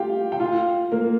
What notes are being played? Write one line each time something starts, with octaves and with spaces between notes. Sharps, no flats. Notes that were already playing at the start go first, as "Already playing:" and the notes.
Already playing: F4 G4 F5 G5
G5
F4 F5
A#3 A#4